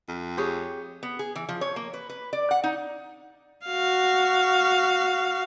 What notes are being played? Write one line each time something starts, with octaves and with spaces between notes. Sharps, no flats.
F2
G4 G#4 C#5
B3
G#4
E3
F3
C#5
A#3
B4
B4
D5
F#5
D#4
F#4 F5